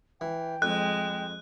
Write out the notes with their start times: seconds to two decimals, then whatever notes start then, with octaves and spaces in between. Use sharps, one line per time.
0.21 E3 G5
0.62 F2 G#3 F#6